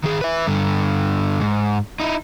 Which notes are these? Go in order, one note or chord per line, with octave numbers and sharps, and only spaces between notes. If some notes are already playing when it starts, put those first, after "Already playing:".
D#3 G#4
B4 E5
G2 D3
G#2
D#4 E4